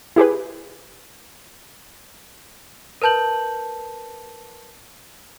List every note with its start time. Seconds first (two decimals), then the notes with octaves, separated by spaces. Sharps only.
0.16 E4 G4 G#4 B4
3.02 A#4 B4 A5 G6 F#7